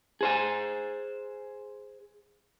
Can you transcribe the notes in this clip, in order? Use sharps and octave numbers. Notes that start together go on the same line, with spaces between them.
G#4 C5 G#5